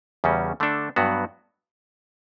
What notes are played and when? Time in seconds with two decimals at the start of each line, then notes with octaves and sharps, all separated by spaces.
0.24 E2 C#3 G3 C#4 F#4
0.60 D3 A3 D4 A4
0.96 G2 F#3 B3 F#4